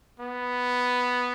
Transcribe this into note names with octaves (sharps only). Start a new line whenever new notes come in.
B3